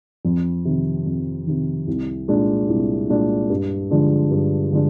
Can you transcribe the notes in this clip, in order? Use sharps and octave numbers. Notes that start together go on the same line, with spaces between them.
F2
C3 D#3
F2
C3 D#3
C2
A#2 G#3 D4
C2
A#2 G#3 D4
G2
D3 F3 G#3 D4
G2
D3 F3 G#3 D4